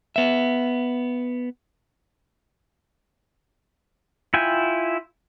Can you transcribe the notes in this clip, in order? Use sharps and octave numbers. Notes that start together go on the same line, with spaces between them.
B3 E5
E4 F4 G5 G#5